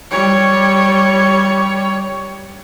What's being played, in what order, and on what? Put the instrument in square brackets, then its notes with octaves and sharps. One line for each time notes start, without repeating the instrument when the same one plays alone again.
[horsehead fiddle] G3 C#5